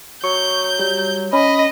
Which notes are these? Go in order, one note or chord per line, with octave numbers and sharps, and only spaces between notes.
F#3 C#6 G6
G3
C#4 D#5 B5